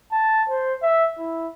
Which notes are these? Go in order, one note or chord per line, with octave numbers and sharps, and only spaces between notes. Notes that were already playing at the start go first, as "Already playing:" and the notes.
A5
C5
E5
E4